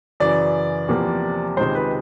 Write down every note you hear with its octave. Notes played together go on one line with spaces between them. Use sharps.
F#2 C#3 E3 D5
E2 C3 F3 A#3
C#2 C3 D#3 G#3 C5
B4